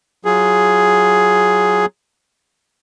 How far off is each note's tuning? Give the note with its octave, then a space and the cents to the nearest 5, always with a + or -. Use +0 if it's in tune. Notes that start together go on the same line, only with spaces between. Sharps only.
F#3 +0 F4 +0 G#4 +5